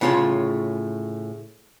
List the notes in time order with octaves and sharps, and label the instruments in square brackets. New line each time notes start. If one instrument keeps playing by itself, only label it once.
[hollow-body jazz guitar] A2 C#3 F4 G#5 A5 C6